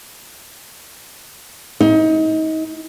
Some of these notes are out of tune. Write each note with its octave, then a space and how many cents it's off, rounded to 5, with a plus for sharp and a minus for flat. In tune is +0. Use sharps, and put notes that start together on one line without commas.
D#4 +30